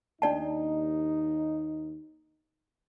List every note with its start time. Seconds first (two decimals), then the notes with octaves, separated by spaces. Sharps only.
0.22 D#2 D4 D#4 D5 A5